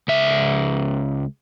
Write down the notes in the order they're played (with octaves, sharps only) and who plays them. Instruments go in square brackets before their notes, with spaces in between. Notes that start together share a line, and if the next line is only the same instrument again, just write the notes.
[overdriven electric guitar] C#2 E5